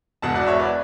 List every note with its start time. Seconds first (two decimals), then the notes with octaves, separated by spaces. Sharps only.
0.22 E1 E2 B2 F#5 A5
0.35 D5 F#5
0.47 C#5 E5
0.59 B4 D5